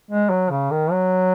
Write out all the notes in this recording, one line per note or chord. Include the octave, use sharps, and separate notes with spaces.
G#3
F#3
C#3
D#3
F#3